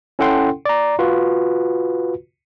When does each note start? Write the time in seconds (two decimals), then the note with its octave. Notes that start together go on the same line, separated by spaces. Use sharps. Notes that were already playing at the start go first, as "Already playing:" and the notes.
0.19 C#4 E4 A4 F#5 G5 C6
0.65 D5 A#5
0.99 F4 F#4 B4